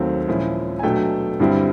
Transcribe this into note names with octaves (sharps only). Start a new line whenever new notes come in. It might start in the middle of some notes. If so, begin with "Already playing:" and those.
Already playing: D#2 D#3 F#3 A3 C4
A#2 F3 G#3 C#4 E4
G#5
B2 F#3 A3 D4 G5
G2 D3 G3 C4 E4